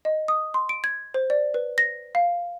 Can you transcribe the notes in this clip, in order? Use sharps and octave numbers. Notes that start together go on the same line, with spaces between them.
D#5
D#6
C6
D7
G#6
C5
D5
B4
A#6
F5